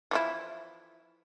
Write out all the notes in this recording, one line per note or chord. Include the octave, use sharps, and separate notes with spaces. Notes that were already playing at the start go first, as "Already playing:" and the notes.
E3 F3 E4